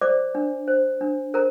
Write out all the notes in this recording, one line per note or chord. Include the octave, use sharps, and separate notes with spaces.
C5 D5 D6
D4
C5
D4
A#4 C5 A#5